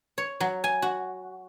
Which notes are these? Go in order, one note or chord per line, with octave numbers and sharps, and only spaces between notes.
C#5
F#3
G#5
F#4